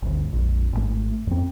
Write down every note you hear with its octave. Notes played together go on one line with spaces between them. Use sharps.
G1 D2
A#1 F2
G#1 B2 A3
F2 C4